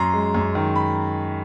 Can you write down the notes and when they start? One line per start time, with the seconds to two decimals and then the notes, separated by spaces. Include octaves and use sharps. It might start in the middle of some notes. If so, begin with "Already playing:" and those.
Already playing: F#2 A#5 C6
0.13 G#3
0.34 F#2
0.55 D#3
0.76 B5